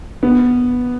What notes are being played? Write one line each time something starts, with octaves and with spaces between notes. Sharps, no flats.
B3